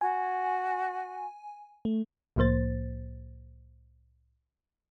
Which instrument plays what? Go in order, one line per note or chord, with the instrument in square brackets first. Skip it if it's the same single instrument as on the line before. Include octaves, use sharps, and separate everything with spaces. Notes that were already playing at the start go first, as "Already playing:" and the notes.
[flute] F#4 [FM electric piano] G#5
[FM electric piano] A3
[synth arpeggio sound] C2 A2 F3 A#3 C5 A6